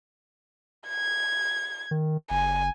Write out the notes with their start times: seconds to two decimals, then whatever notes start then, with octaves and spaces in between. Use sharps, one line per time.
0.89 G#6
1.91 D#3
2.30 F#1 G#5